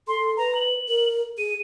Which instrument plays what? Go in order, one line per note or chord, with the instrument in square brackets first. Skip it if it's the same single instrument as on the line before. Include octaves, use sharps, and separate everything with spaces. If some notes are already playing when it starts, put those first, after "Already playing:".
[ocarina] A4 [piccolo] C6
[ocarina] B4 [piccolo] A#5
[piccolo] F#7
[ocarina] A#4
[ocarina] G#4 [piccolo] D#7